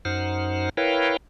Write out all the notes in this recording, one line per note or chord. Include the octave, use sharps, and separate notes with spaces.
F#2 D#4 C5 F#5 F6
E4 A#4 B4 C#5 F5 G5